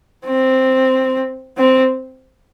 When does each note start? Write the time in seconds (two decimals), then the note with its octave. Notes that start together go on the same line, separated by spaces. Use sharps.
0.27 C4
1.58 C4